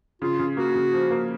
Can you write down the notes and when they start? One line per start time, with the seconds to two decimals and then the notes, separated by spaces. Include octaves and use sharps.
0.22 C#3 F4
0.39 C#3
0.57 A#3 F#4
0.75 C#3
0.93 F3
1.11 A#3